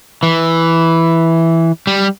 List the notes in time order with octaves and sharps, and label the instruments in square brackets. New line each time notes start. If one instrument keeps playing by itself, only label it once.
[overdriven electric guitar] E3
G3